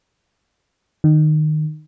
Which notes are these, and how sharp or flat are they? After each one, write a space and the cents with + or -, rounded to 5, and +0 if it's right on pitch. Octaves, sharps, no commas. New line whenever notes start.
D#3 -20